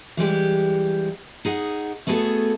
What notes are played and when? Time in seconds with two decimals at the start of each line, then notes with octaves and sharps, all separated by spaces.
0.17 E3 G3 G#3 G4
1.45 D#4 G#4 F#5
2.07 A3 B3 F#4 G#4 A4